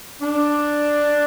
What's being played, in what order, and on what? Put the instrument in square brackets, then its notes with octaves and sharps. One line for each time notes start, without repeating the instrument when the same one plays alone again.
[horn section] D4